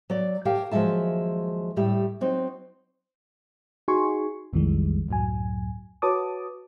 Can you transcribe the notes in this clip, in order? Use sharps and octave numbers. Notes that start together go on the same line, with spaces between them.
F#3 D5
G4 A#4 C#5 F5 G5 A5
D#2 F3 F#3 G#3 E5 A5
A2 G3 G4 E5
F#3 C4 D#4
D#4 F#4 G#4 G#5 C6 C#6
B1 F2 D#3 E3 G3 G#3
C#2 F#2 A2 F#3 G#5
F#4 B4 C#5 A5 D6 D#6